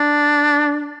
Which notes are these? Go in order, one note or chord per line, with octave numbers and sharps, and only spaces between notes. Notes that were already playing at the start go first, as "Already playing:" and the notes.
Already playing: D4